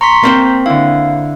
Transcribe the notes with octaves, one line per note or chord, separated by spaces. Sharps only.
A#5 C6 C#6 B6
A#3 C4 C5
D3 E4 F5